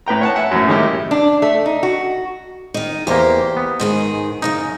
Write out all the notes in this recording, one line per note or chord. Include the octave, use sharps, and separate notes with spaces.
A2 B4 G5 A#5
C#5 F#5 A5
E5 F#5 G#5
F#2 A2
A2 D#3 G#3 D#4 E4 G4
D4
A3
D#4
F#4
D#3 D#4
E2 A#3 G4 C5
B3
G#2 D#3 G#4
F#2 A#2 C#3 D#4